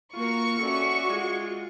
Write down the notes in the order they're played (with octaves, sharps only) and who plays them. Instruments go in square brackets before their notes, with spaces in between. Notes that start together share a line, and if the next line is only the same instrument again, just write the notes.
[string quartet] A#3 F#4 A#4 [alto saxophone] F4 [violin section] C#6
[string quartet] C#4 D5 E5 [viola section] F#4 [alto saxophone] A4
[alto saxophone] G#3 [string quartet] F4